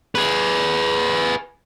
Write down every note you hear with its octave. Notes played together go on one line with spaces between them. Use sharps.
G#4 B4